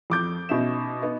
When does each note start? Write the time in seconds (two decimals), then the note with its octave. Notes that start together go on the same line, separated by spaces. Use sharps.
0.10 F2 D6 G6
0.49 B2 C#4 D#4 E5 E7
1.02 B3 D#4